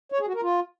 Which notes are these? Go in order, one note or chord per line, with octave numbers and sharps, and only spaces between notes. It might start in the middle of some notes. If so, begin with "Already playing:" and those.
C#5
G#4
F#4
A#4
F4